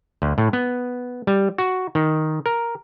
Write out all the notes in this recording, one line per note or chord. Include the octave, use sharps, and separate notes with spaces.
D2
A2
B3
G3
F#4
D#3
A#4